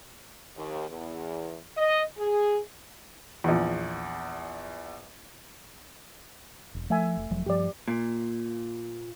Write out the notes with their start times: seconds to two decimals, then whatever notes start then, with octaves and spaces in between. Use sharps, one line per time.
0.56 D#2
0.90 E2
1.77 D#5
2.18 G#4
3.44 A#1 E2
6.75 E1
6.90 F3 A3 E5 G#5
7.17 F1
7.30 E1 F3 F#3
7.46 G2 F3 G4 D5
7.88 A#2